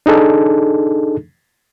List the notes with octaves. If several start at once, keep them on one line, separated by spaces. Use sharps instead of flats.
D4 D#4 G#4 A4